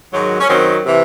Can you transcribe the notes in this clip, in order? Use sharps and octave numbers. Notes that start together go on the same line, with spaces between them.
G#2 D#3 F#3
C#4
F#2 D#3 F#3 C4
C3 E3